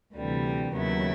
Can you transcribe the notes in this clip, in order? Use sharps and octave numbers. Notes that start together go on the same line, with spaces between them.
D2 C3 E3 G3
D#2 C#3 F#3 B3 E4